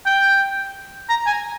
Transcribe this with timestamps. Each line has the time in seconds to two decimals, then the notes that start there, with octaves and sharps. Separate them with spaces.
0.06 G5
1.09 A#5
1.26 G#5